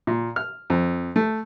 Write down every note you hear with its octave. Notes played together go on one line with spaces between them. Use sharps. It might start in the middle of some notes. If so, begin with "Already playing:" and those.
A#2
F6
F2
A3